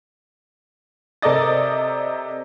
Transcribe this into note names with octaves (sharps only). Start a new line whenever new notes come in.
C3 A4 A#4 D5 D#5 A6